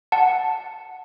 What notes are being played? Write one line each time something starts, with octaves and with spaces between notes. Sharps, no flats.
F#5 A5